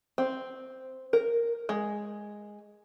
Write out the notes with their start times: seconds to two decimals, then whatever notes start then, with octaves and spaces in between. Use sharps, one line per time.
0.18 C4
1.13 A#4
1.69 G#3